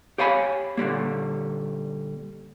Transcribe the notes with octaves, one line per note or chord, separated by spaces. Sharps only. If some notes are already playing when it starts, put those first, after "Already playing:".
G4 C#5 F5 G#5 B5
A#2 D3 G3 A#3